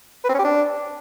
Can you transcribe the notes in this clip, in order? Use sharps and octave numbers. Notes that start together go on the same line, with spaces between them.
B4
C4
C#4
G4
D4